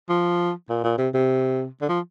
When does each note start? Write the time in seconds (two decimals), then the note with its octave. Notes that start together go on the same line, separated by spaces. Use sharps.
0.09 F3
0.69 A#2
0.84 A#2
0.98 C3
1.14 C3
1.81 D3
1.89 F3